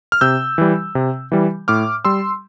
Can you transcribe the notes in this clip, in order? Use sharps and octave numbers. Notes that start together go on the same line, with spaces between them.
F6
C3 E6 G6
E3 G3
C3
E3 G3
A2 D6 F6
G3 C6 E6